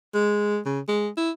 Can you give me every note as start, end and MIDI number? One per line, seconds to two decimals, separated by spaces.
0.14 0.59 56
0.66 0.80 49
0.88 1.08 56
1.17 1.30 64